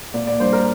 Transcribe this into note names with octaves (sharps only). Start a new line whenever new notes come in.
A#2 D5
D5
G3 A#3 D4 C5
A#4